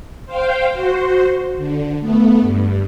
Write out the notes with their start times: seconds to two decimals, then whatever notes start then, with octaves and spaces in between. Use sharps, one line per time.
0.26 C5 F5 G5
0.70 F#4 C5
1.57 D3
2.00 A3 B3
2.40 G2